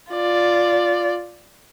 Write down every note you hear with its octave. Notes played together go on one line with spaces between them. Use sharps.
F4 D5